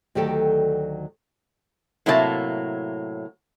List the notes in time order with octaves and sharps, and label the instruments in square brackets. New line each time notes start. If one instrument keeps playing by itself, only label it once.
[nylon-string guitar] D2 D#3 F#3 G4 A4 D5
[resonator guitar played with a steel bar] A2 C3 F#3 A#3 D5 A5